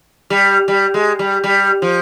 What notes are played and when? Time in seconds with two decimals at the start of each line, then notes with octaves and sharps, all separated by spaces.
0.30 G3
0.68 G3
0.94 G#3
1.19 G3
1.44 G3
1.82 F3